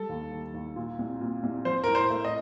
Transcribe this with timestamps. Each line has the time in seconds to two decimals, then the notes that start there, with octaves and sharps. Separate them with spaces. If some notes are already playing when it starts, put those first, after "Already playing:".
Already playing: G3 A4
0.09 D#2
0.32 D#2
0.54 D#2
0.76 A#2
0.99 C2
1.21 A#2
1.43 C2
1.65 F3 C5
1.84 A2 A#4
1.95 C5
2.10 A3
2.25 D#5